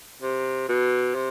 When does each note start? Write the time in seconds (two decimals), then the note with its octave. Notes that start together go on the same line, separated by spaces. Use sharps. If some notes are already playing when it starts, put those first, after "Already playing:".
0.22 C3
0.69 B2
1.15 C3